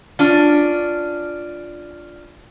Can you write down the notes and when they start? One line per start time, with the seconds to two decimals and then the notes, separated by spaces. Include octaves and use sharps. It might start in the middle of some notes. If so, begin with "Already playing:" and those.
0.19 C#4 D4 F4